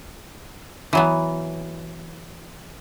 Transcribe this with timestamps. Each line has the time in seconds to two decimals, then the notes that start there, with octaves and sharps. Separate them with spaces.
0.93 E3 F#3 B3